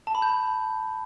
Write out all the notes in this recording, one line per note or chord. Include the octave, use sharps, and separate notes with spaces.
A5
B5
G6